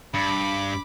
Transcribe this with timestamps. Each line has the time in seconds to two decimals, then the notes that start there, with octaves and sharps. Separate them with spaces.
0.14 G2 B5 D6